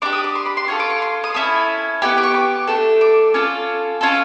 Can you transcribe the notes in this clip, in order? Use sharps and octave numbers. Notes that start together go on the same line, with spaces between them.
D4 G4 D6
D#6
D6
C6
B5
C6
C#4 F4 A4 C#6
D6
C#6
C6
D#6
C#4 E4 A4 D#6
B3 E4 G4 C#6
D6
C#6
D6
A3 D4 F4 A4
D6
C#4 F4 A4
C#4 F4 A4